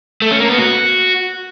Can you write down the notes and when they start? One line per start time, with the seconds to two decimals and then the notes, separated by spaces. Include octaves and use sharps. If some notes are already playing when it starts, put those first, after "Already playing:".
0.22 A3
0.31 C#4
0.40 A#3
0.49 B3
0.59 F#4